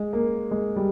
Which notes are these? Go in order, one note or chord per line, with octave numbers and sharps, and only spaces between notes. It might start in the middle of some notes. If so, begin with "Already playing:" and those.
Already playing: G#3
A#3
G#3
G3